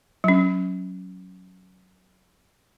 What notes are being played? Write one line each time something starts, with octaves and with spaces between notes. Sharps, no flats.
F#3 C#4